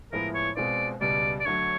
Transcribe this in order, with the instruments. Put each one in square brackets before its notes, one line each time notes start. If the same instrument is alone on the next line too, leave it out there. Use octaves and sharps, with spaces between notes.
[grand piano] A2 F3 G#3 B3 E4 [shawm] A#4
[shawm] C#5
[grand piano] B2 G#3 C4 F4 [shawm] D5
[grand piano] C#2 B2 G3 [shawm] D5
[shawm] D5
[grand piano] D3 F#3 A3 D4 [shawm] C#5